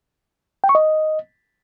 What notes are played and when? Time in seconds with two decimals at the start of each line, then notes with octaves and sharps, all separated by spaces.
0.64 G5
0.69 C#6
0.75 D#5